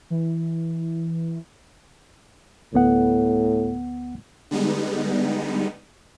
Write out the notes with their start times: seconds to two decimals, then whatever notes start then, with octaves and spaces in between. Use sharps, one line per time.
0.10 E3
2.74 D2 A2 B3 F#5
4.51 D3 G3 G#3 B3 D#4